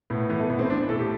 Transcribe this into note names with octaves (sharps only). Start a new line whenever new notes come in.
A2 B3
E3 B3
A3
A2 B3
C4
E3 D4
A2 A4
G4